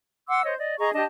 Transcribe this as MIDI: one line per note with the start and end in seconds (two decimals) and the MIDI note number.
0.28 0.42 78
0.28 0.42 84
0.28 0.42 86
0.28 0.42 88
0.44 0.54 72
0.44 0.54 73
0.44 0.54 75
0.59 0.77 74
0.59 0.77 75
0.79 0.91 68
0.79 0.91 75
0.79 0.91 82
0.79 0.91 85
0.94 1.04 62
0.94 1.04 67
0.94 1.04 75
0.94 1.04 81